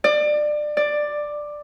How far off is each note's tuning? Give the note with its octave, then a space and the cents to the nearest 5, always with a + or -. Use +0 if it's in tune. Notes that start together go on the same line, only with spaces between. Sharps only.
D5 +25
D5 +10